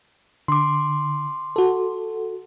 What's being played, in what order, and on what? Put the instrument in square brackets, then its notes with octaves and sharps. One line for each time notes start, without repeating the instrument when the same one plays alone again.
[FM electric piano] D3 [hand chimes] C6 D6
[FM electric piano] F#4 A4